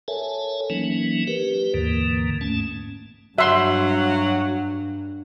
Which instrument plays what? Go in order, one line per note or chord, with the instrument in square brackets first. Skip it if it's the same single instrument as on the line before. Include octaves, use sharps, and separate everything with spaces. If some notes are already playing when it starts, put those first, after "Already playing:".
[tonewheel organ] A4 A#4 C#5 E5 G#5 A5
E3 F#3 A#3 C#4 D#4
G4 A#4 B4
D#2 G#2 D3 E3 A#3
G#2 A3 C#4 A5
[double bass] G2 [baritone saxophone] F#3 [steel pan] E5 C6